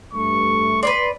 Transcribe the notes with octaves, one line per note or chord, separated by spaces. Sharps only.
G2 A3 C#6
B4 C#5 D5 C6